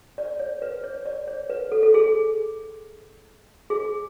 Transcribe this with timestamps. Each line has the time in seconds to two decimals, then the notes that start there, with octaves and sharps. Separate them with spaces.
0.18 D5
0.40 C#5
0.62 B4
0.84 C#5
1.06 D5
1.27 C#5
1.50 B4
1.72 A4
1.83 A4
1.94 G#4
3.70 G#4